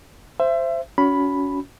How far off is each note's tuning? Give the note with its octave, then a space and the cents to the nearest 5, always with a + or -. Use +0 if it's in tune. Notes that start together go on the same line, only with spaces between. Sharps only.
C5 +0 E5 +30
C#4 +30 F#4 +0 B5 +0